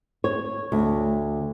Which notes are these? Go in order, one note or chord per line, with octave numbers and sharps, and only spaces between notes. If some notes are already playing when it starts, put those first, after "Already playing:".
C#5
D2